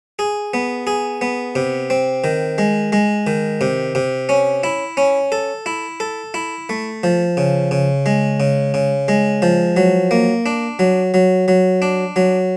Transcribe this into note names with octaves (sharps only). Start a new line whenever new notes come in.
G#4
B3
G#4
B3
C3
C4
D#3
G#3
G#3
D#3
C3
C3
C#4
E4
C#4
A4
E4
A4
E4
A3
F3
C#3
C#3
G#3
C#3
C#3
G#3
F3
F#3
A#3
D4
F#3
F#3
F#3
D4
F#3